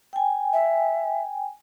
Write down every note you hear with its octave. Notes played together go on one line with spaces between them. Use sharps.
G5 G#5
E5